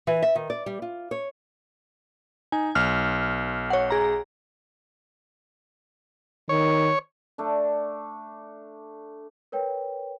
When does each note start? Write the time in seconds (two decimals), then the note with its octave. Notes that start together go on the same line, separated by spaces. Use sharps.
0.07 E3
0.22 E5
0.35 D#3
0.50 D5
0.66 G3
0.82 F4
1.11 C#5
2.52 D#4 G#5
2.75 B1 F6
3.70 C#5 F#5
3.90 G#4 A#5
6.49 D#3 C#5
7.38 A3 D4
9.52 A#4 B4 C#5 G5